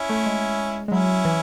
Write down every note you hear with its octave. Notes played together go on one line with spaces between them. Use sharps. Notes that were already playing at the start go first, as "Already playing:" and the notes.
Already playing: C#4 E4
A3
G#3
G#3
F#3 C#4 E4
E3